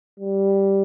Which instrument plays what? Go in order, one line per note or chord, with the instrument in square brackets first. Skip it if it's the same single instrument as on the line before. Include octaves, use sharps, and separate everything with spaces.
[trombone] G3